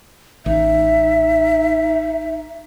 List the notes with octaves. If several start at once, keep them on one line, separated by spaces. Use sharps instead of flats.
A1 D#4 E5